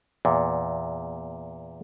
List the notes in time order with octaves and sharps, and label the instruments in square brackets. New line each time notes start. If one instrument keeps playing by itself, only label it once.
[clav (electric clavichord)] E2 A#2